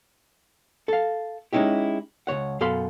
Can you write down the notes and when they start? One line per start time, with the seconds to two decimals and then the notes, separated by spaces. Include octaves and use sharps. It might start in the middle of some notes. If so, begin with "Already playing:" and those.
0.88 A4 F5
1.53 G#3 C#4 D#4 E4 G4
2.27 C#2 A#2 C#5 F#5
2.61 F#2 B2 A4 F5 B5 C6